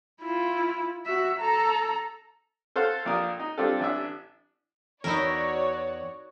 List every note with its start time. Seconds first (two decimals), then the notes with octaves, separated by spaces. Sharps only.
0.22 E4 F4
1.06 F#4 E5
1.40 A4 A#5
2.76 A4 C5 F5 F#5
3.05 A#1 A#3 G4 A#4 D5 D#6
3.39 D#4
3.58 G3 C4 D4 F4 G4 A4
3.80 A1 D4 E5
5.04 E2 D#4 E4 F#4 A#4 C#5 D5 G5